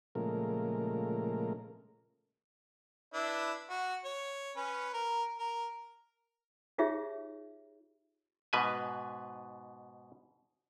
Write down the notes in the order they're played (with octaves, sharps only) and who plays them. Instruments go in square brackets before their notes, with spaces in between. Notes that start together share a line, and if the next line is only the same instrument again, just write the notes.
[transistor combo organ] A#2 C#3 F3 G#3 A3 A#4
[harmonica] D4 E4 B4
F#4
C#5
C#4 B4
A#4
A#4
[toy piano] D#4 F4 G4 G#4 C#5 E5
[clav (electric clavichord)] G#2 B2 B4 G#5